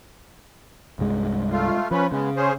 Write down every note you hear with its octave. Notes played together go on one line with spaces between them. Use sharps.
C2 G2 G#3
A3 F4
F3 C#4 B4
C#3 G#3 B3
C#4 G#4 C5